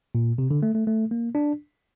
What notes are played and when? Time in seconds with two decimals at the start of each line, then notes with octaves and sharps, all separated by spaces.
0.15 A#2
0.38 C3
0.51 D3
0.63 A3
0.75 A3
0.87 A3
1.11 A#3
1.35 D4